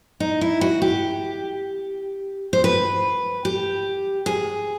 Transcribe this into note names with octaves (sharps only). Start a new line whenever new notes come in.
D#4
E4
F#4
G4
C5
B4
G4
G#4